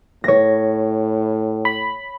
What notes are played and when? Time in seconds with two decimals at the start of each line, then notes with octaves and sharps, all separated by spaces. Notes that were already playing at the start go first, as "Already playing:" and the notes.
0.24 A2 C#5 A#6
1.65 B5